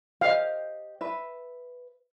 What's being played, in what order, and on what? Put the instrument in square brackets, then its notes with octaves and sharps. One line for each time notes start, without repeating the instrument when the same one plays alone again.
[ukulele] G4 C5 D#5 [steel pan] F5
[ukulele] B4 E5